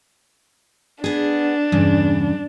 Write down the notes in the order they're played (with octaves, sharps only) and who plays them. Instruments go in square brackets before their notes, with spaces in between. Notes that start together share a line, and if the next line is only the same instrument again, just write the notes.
[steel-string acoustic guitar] B3 G#4 [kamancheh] D4
[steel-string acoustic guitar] E2 G2 C#3